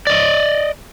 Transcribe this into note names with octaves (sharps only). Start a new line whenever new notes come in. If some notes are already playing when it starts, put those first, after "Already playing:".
D5 D#5